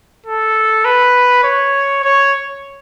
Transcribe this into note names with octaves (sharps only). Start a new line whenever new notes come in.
A4
B4
C#5
C#5